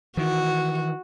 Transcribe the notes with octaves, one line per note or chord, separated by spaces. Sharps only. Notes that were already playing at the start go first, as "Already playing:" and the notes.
D#3 E3 F#4